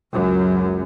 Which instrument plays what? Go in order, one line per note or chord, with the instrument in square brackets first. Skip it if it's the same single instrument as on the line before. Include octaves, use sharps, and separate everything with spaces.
[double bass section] C#2 F#2